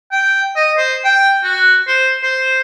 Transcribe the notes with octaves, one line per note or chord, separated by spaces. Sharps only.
G5
D#5
C5
G5
F#4
C5
C5